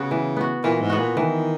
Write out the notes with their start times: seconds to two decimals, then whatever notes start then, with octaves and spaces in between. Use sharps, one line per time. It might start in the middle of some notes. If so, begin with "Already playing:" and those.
Already playing: C#3 B3 F#4
0.11 E3
0.36 B3 F#4
0.64 A#2 E3
0.81 G#2
0.90 B3 F#4
0.99 A#2
1.17 D#3 E3